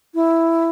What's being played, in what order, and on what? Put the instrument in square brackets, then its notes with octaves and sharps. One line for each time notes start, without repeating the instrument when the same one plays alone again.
[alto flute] E4